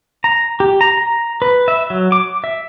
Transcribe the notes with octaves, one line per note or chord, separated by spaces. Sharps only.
A#5
G4
A#5
A#5
B4
E5
F#3
D6
E5